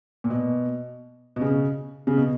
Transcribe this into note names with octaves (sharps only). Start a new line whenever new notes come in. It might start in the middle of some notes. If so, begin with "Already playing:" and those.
A#2
B2
B2
C#3
C#3
B2